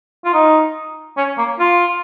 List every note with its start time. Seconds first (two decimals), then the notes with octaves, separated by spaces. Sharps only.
0.25 F4
0.34 D#4
1.17 C#4
1.38 A#3
1.59 F4